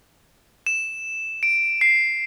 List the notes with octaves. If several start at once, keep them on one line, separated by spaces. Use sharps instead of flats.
E7
D7
C7